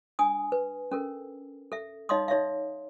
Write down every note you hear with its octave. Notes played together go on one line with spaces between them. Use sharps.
D4 G#5 D#6
B4
C#4 A4 A#4
A4 E5
D#4 C#5 D#5 F5 C6 D#6
D#4 C#5 E5 F5